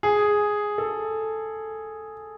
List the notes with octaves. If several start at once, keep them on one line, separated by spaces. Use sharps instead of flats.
G#4
A4